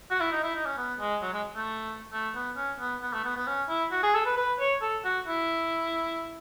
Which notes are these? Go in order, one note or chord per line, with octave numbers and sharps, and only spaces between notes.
F#4
E4
D#4
E4
D#4
C#4
B3
G#3
F#3
G#3
A3
A3
B3
C#4
B3
B3
A3
B3
B3
C#4
E4
F#4
G#4
A4
B4
B4
C#5
A4
F#4
E4